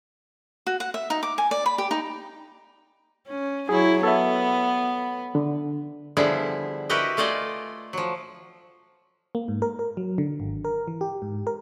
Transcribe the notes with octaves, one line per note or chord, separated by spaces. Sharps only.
F#4
F#5
E5
D#4
D6
G#5
D5
B5
G4
D#4
C#4
F#3 E4 G#4 C#5
B3 A4 C#5 E5
D3
D3 F3 G3 B3 E4 G#4
E4 F#4 G4 A#4 B4 D#5
A3 F4 D5 D#5 G#5
F3 F#3
A#3
G#2
A#4
A#4
F#3
D3
G#1
A#4
E3
G4
G#2
A#4